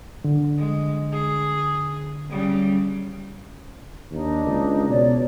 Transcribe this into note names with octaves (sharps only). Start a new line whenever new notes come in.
D3
G#3
G#4
C#3 G3
D#2 D4 D#4
C#2
B2 C#5 D5